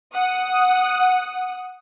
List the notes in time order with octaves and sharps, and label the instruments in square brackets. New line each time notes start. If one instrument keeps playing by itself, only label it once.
[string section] F#5 D#6